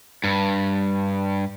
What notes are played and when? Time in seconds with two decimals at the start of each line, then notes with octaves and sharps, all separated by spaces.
0.24 G2